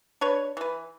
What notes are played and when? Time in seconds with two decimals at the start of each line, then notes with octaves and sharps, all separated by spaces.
0.21 D4 B4 C#5
0.57 E3 B4